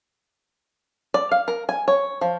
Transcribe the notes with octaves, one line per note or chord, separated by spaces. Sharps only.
D5
F5
A#4
G#5
C#5
F3